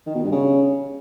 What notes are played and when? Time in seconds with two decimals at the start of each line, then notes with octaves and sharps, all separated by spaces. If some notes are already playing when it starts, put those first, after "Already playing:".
0.06 D#3
0.15 B2
0.23 G2
0.32 C#3